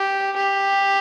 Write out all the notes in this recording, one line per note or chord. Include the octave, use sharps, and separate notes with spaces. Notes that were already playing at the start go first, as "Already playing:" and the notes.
Already playing: G4
G4